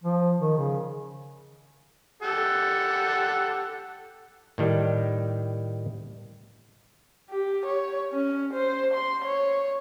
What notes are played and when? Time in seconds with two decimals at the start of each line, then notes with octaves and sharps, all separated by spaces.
0.03 F3
0.41 D#3
0.57 C#3
2.22 G4 A4 F#5
4.58 A2 D#3 G3
7.30 G4
7.65 C#5
8.13 C#4
8.54 C5
8.94 C6
9.25 C#5